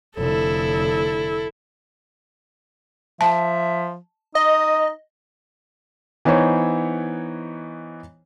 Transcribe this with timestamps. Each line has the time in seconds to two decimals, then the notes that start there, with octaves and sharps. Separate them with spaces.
0.17 F1 D3 E4 A4
3.21 F3 E5 A5
4.35 D#4 D#5 D#6
6.25 E3 B3 D#4 C5 C#5